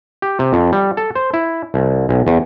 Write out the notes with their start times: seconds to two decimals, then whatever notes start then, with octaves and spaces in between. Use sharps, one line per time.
0.22 G4
0.39 C3
0.53 F2
0.72 G3
0.97 A4
1.15 C5
1.34 E4
1.74 C2
2.09 B1
2.27 E2